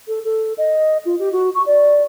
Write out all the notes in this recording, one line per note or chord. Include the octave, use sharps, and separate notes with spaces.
A4
A4
D#5
F4
G4
F#4
C#6
D5